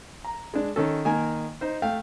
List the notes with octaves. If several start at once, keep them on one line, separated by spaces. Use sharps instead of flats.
A#5
G#3 D4
D#3 C#4 A4
D#3 A#3 G#5
D#4 C5
A3 F5 G5